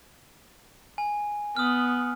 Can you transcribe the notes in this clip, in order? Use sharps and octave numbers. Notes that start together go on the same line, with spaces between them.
G#5
B3 D#6 F6